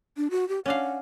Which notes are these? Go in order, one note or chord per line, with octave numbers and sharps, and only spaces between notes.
D4
F#4
G4
C#4 D4 F5 F#5